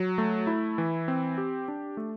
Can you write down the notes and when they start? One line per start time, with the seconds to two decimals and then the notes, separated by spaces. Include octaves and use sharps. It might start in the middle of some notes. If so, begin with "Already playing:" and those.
Already playing: F#3
0.18 A3
0.47 E4
0.78 E3
1.08 C4
1.38 G4
1.68 D4
1.97 A3